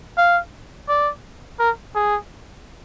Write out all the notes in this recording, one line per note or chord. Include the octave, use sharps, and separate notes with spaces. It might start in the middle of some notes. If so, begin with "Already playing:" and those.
F5
D5
A#4
G#4